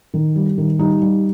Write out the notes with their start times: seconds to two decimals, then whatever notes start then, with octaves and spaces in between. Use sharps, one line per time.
0.14 D#3
0.36 G3
0.58 D#3
0.79 G3 D#4
1.02 G3